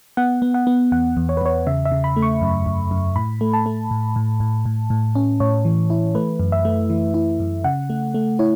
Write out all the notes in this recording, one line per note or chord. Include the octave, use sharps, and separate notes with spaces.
B3 F#5
B3
F#5
B3
E2 F#5
E2
C#5
B4
E2 C#5
C#3 E5
E5
C#3
B5
A3
C#6
F#2
F#2
F#2
A2 B5
A3
A5
A3
A2
A2
A2
A2
A2
C#4
A2 C#5
E3
E4
A3 B4
F#2
E5
A3
E3
E4
F#2
C#3 F#5
A3
A3
E4 C#5